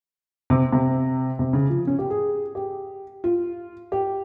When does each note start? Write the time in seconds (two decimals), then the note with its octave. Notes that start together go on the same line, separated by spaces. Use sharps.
0.50 C3
0.72 C3
1.39 C3
1.53 C#3
1.70 F3
1.87 C#4
1.99 G4
2.10 G#4
2.55 G4
3.24 F4
3.92 G4